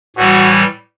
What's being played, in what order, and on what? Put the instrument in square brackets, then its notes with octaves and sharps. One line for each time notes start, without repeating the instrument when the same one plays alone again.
[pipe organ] A2 E3 G3 [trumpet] F#4